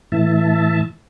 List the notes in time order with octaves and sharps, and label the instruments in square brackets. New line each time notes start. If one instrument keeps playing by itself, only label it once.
[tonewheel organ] A2 E3 E5 A5